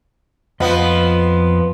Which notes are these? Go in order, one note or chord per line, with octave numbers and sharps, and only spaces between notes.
F2 F3 B3 D#5